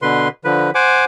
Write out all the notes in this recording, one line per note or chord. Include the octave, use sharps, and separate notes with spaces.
B2 D3 B4 C6
D3 F3 B4
C5 F#5 G#5 D6